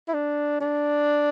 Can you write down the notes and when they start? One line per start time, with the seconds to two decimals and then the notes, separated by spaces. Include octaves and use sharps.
0.08 E4
0.14 D4
0.60 D4